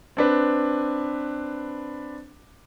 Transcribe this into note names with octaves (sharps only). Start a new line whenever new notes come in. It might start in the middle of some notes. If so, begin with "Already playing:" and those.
C4 D4 B4